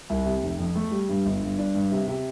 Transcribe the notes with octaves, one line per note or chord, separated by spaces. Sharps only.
C2
C3
F1
F2
A3
G3
G2
G1
G2
D4
G2
C3
C3